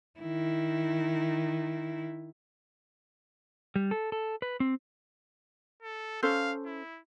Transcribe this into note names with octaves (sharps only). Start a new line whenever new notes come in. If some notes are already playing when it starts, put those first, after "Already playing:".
D#3 E4
G3
A4
A4
B4
C4
A4
C#4 A4 C5 F5
E4